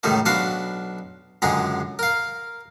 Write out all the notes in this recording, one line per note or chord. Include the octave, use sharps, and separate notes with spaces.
C#2 A2 D#3 G3 A3 A#3
B1 D4 F#4 F5 B5 C6
C#2 F#2 D3 G#3 G#4 A#5
A#4 F5